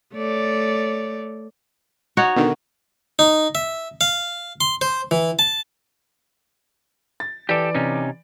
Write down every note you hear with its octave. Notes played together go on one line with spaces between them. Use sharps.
A3 C#5 D5
D#4 F#4 C#5
B2 D3 D#3
D#4
E5
F5
C6
C5
E3
A5
A6
E3 G4 A4 D5 D7
C3 C#4 D#4